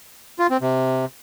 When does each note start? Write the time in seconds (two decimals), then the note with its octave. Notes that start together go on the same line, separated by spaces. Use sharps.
0.39 F4
0.50 C4
0.61 C3